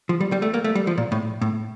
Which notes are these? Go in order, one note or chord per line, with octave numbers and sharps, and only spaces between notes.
F3
G3
G3
A3
A#3
A3
G3
F3
A#2
A2
A2